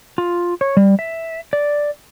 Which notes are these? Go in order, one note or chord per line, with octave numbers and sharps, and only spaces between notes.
F4
C#5
G3
E5
D5